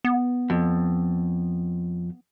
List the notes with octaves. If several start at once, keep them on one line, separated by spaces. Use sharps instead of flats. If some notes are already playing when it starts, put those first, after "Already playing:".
B3
F2